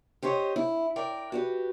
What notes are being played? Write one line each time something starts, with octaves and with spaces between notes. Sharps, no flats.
G4 C5 C#5 D#5
E4
A#4 D5 G5
F#4 G4 B4